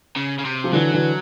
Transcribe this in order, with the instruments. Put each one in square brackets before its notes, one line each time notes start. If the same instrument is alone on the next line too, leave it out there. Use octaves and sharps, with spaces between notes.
[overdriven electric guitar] C#3
C#3
C3
[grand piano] F3
[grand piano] D3 E3 [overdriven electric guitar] F#3
[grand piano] D3 E3